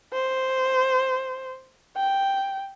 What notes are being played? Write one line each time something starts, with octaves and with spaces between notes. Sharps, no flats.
C5
G5